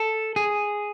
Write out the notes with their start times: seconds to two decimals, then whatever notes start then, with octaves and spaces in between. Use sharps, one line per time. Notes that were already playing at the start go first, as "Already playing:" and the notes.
Already playing: A4
0.36 G#4